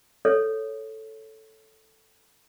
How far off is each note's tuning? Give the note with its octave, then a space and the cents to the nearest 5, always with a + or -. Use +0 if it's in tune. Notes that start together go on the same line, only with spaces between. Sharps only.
A4 +0 C#5 +0